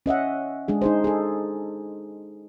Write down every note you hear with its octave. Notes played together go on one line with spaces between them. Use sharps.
C#4 D#5 E5 F#5
G#3 D4 G#4
D#4 G#4 C5
G#4 A4